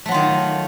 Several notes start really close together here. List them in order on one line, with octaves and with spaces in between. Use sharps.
A3 F#3 F4 D#3